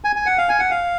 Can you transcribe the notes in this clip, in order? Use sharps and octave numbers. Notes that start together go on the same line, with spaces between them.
G#5
G#5
F#5
F5
G#5
F#5
F5